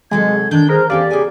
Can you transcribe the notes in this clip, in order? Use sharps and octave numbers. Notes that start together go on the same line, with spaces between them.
C3 F#3 G#3 A4 G#6
D#3 D4 G5 G6
G#4 A#4 C5
E2 C#4 G4 A4 D5 F5
C#3 G#4 G#5